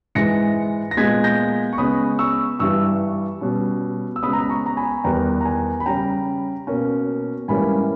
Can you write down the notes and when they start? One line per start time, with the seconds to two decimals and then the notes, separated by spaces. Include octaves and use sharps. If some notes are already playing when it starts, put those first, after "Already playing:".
0.15 G#2 E3 G#3 A#6 C#7
0.91 A#6
0.97 A#2 G#3 B3 G#6 B6
1.24 G6 A#6
1.73 C#6
1.78 C#3 G#3 B3 B5 D#6
2.19 C#6 E6
2.59 G2 E3 G3 C#6 E6
3.41 B2 G3 C#4
4.16 E6
4.23 C#3 G#3 B3 B5 D#6
4.33 A#5
4.42 B5
4.49 A#5 C#6
4.66 A#5
4.77 G#5 B5
5.04 E2 D#3 G3 B3 G5 A#5
5.41 A#5
5.45 G#5
5.80 B5
5.86 C#3 G3 C#4 G5 A#5
6.67 B2 A#3 C#4
7.48 G#2 E3 G3 A#3 C#4 G#5 B5